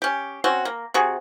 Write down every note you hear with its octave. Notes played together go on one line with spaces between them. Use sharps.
C#4 G4
C4 C#4 F#4
A#3
C3 F#4 G#4